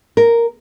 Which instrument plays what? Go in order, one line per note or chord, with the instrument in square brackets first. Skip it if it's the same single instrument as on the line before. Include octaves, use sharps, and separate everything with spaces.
[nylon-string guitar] A#4